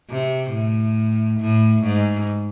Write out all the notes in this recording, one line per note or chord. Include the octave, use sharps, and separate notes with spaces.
C3
A2
A2
G#2